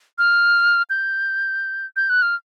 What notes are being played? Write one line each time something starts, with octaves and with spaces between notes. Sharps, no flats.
F6
G6
G6
F#6
F6